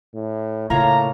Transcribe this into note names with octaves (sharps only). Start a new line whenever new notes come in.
A2
A2 C#3 A#3 F4 C#5 A#5